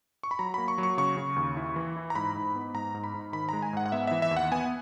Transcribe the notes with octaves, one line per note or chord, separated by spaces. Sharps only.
C#6
B5
F#3 A#5
A#3 B5
C#6
F#3
C#6
C#3 C#6
C#3
D#2
E4
E3
E4
A#5
G#2 B5
G#2
B3
G#2 A#5
G#2
B5
G#2
D#3 B5
G#3 A#5
G#5
G#2 F#5
F#5
B3 E5
E3 E5
E5
D#2
F#5
B3 G#5